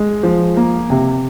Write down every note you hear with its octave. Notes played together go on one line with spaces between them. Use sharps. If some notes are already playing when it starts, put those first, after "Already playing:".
Already playing: G#3
F3
A#3
C3